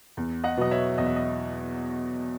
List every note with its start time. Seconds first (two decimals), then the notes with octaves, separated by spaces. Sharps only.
0.17 E2
0.44 D#5 F#5
0.57 B2 F#3 B3 D#5
0.71 C#5 E5
0.98 E2 D#5
1.07 E5
1.16 D#5